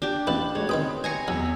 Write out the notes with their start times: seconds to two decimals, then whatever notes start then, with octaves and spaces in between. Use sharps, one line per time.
0.02 D4 G4
0.27 A1 B4 A5 F#7
0.55 G#3 A3 F#4 C#5
0.69 D#3 C4 B4 G5 C6 D#6
1.04 G#5 A#5 C#6
1.28 E2 F#3 E6